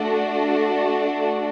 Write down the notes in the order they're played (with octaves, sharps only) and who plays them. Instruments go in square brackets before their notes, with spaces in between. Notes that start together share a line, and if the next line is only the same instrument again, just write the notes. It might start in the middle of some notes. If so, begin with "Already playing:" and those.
Already playing: [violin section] A3 D4 F#4